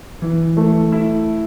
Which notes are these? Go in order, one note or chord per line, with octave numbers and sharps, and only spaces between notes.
E3
A3
E4